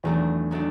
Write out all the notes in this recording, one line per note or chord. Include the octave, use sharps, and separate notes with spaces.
E2 D#3 F#3 A3 D4
D#3 F#3 A3 D4